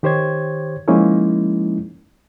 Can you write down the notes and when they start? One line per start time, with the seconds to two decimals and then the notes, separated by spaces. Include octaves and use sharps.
0.03 D#3 G4 C5 C#5 G#6
0.88 F3 G#3 A#3 C#4 D#4 E4